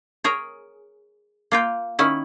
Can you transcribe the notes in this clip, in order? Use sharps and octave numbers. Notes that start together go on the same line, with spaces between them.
G#4 A#4 C#5
A#3 F4 G5
D#3 C#4 E4